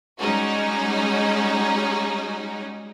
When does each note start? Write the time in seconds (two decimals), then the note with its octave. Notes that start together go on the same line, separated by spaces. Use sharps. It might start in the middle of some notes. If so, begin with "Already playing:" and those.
0.19 G3 G#3 C#4 D#4 F#4